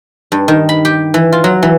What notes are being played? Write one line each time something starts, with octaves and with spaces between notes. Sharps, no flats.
G2
D#3
B5
G4
E3
F4
F#3
E3